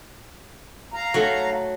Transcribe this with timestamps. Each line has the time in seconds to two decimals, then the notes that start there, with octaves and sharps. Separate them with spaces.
0.94 F5 A#5
1.14 F#3 A3